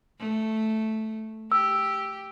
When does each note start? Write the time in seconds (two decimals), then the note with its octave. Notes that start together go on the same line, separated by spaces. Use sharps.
0.19 A3
1.52 G4 E6